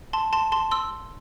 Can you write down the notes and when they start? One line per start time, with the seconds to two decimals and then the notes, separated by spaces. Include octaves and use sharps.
0.13 A5 C6
0.33 A5 C6
0.52 A5 C6
0.71 C6 E6